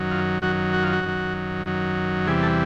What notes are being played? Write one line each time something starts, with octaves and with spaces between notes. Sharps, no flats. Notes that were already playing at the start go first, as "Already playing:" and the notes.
Already playing: F#2 D#3 F#3
F4
F#2 D#3 F#3 F#4
F#4
F4
F#4
F#2 D#3 F#3
F#2 D#3 F#3
E2 C3 E3 G3 G#4
A4